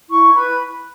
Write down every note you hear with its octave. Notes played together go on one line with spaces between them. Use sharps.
E4 C#6
B4 B5